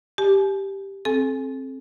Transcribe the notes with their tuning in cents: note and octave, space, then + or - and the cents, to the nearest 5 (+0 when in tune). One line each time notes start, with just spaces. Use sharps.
G4 +0 G#5 +45
C4 +20 A4 -30 G#5 +0